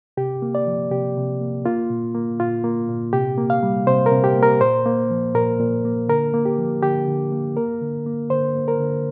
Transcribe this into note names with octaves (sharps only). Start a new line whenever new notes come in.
C3 G4
A#3
D5
F3
C3 G4
C3
A#3
A#3 F4
A#2
A#3
A#2 F4
A#3
A#2
C3 G4
A#3
F5
G3
C3 C5
A#4
C3
G4
A#3
A#4
A#2 C5
A#3
F3
A#2 A#4
A#2
A#3
D3 A#4
A#3
G4
F3
D3 G4
D3
A#3
A#3 A#4
D3
A#3
D3 C5
A#3
A#4
D3